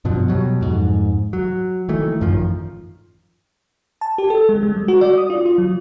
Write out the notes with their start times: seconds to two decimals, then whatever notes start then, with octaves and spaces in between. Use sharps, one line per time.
0.05 G2 B2 F3 F#3
0.28 B2 F#3 G3
0.61 F2 G#2
1.33 F#3
1.89 D#3 E3 A3
2.21 A1 F#2 D#3 F3
4.01 A5
4.18 G4
4.30 A4
4.49 G#3
4.63 G#3
4.77 G3
4.88 F#4
5.01 D5
5.18 D#6
5.30 F4
5.46 F4
5.58 F#3